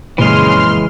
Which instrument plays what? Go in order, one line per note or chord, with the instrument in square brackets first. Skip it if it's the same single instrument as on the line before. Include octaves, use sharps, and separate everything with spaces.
[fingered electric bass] F#1 A#2 [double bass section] F2 C#3 [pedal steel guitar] E3 G#3 [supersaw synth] C6 F6